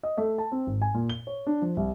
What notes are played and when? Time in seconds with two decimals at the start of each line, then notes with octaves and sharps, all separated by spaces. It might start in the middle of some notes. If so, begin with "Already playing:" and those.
0.03 D#5
0.17 A3
0.38 A5
0.52 C4
0.67 G#1
0.82 G#5
0.94 A#2
1.09 G7
1.27 C#5
1.47 D4
1.62 F3
1.77 C2